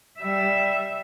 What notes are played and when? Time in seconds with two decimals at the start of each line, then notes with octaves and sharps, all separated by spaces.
0.20 G3 E5